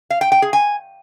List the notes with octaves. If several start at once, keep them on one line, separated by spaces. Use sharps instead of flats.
F5
G5
G5
G#4
G#5